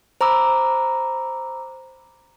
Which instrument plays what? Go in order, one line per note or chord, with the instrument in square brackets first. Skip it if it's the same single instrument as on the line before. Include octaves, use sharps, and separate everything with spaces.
[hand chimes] C5 A#5 B5 D6 E6